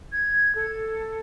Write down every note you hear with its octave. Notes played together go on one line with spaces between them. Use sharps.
G#6
A4